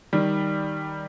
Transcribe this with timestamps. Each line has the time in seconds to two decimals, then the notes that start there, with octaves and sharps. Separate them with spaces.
0.13 D#3 G3